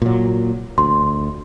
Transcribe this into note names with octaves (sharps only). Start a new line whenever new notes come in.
A#2 F#3
D2 C6